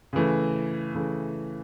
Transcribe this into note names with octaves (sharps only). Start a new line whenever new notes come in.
C#3 E3 A3
C#3 E3 A3